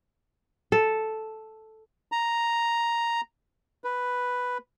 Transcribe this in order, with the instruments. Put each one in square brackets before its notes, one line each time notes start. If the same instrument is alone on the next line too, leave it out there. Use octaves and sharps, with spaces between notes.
[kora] A4
[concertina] A#5
B4